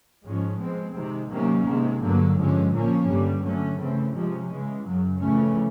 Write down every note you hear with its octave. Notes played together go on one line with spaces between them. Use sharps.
G#2 F3 G#3 C#4
B2 G#3 C4
C3 D#3 G#3
C3 D#3 F#3 A#3 C#4
C3 D#3 G#3
G2 D3 F#3 A#3
G2 D3 F3 G#3 C#4
A#2 F3 A#3 C#4
G2 D3 G3
D3 F#3 A3 C#4
C#3 E3 A3 C4
C3 F3 G#3 C#4
C#3 E3 G#3
F#2 C#3 F#3
F2 C#3 E3 A3 C#4